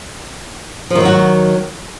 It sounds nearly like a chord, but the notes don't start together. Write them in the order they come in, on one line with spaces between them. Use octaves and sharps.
F3 D#3 F#3 F#4